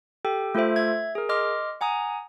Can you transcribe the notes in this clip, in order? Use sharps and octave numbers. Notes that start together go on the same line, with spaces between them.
G4 A4 G5
A3 F4 A4 C5 E5
E5 G#6
G#4 A#4
D#5 C6 D6 F6
F#5 G#5 A#5 D#6